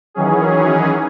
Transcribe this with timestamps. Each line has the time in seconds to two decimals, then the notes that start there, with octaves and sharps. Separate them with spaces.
0.14 D#3 E3 F#3 C#4 G#4